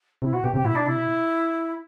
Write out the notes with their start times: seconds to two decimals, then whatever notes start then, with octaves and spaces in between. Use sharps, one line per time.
0.22 C3 E4
0.32 B2 F#4
0.44 B2 G4
0.54 C3 G4
0.63 A2 E4
0.69 B2
0.75 D4
0.86 C3 E4
0.96 B2